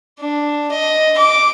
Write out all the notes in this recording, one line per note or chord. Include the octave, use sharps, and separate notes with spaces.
D4
D#5
D6